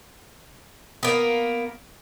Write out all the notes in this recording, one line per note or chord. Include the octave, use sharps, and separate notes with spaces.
A#3 B3